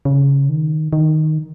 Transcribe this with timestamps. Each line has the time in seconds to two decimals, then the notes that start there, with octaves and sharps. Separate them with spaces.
0.05 C#3
0.49 D#3
0.93 D#3